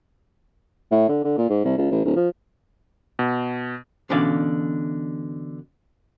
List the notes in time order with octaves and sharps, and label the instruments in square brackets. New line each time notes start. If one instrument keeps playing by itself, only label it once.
[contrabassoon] A2
D3
D3
A#2
G#2
C2
C#2
A1
D1
F3
[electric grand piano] B2
[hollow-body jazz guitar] B2 D3 E3 C#4 D5 F5